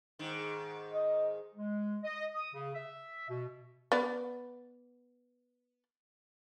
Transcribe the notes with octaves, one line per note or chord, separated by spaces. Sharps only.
G#2 D#3
D#5
G#3
D#5
D#6
C#3
E5
B2
B3 D5